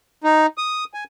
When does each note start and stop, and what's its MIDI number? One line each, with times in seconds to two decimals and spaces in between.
0.24 0.46 63
0.58 0.84 87
0.94 1.04 80